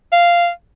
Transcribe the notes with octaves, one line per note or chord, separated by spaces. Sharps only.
F5